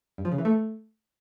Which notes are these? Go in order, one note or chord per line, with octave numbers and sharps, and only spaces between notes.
G2
F3
C#3
E3
A3